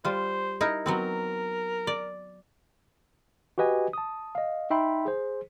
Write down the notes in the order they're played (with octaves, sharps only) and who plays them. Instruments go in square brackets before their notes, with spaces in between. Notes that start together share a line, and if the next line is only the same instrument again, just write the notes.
[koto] G3 F4 [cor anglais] C5
[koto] D#4 E4 A#4
[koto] F#3 B3 C4 [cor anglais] A#4
[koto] D5
[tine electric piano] F#4 G4 B4 D#5 G#5
A5 D#6
D#5 F5
D#4 E5 G5 B5 C6
G#4 C5